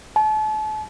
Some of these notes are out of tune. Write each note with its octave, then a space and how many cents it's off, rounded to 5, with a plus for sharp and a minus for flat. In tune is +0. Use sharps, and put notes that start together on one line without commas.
A5 -35